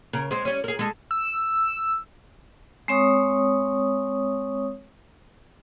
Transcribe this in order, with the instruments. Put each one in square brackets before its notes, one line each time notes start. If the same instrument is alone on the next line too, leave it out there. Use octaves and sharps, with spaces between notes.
[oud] C#3 A#4
G#3 C4
G3 C#4
G#4 A#4
G#3 A4
[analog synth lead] E6
[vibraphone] G#3 C4 C#5 C#6 D#6